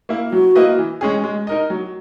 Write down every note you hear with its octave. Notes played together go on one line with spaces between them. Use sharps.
A#3 E4
F#3 F#4
A#3 E4 B4 D#5
E3
G#3 C#4 G#4
G#3
D#4 A#4 D#5
F#3